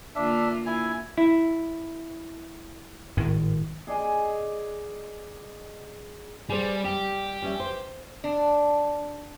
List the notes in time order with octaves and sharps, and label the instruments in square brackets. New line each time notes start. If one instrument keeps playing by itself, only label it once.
[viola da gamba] D3 A#3 F4 [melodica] D4 E5
[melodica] E4 G#5
[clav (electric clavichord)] E4
[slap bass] G#1 A2 D#3
[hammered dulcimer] G#4 D5 D#5 G#5
[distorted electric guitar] G3 [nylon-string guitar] G#4 C5
[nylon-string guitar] G3 [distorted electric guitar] G4
[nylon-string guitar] G3 C#4 E5
C5
[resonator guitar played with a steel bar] D4